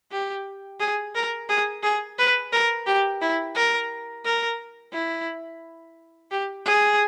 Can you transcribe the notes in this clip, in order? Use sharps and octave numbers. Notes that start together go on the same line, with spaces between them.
G4
G#4
A#4
G#4
G#4
B4
A#4
G4
E4
A#4
A#4
E4
G4
G#4